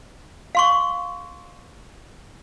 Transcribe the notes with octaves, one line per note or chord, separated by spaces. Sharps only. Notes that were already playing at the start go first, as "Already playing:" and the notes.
F5 C6 C#6